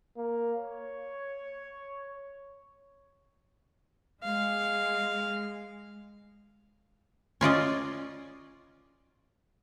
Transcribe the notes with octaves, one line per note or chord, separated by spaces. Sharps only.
A#3
C#5
G#3 F5
C#4 F4 D5 D#5